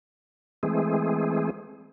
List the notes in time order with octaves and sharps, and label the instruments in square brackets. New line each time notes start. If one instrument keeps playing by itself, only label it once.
[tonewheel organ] E3 G#3 A3 C4 G#4